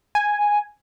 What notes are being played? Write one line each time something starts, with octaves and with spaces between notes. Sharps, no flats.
G#5